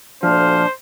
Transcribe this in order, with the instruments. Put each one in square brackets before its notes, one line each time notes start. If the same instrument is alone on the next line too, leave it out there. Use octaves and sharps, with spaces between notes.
[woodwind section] D2 F6 [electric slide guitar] A#2 F3 [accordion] D4 [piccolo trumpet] C5